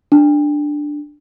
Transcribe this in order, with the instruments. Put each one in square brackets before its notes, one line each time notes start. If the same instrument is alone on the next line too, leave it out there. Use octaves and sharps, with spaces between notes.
[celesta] D4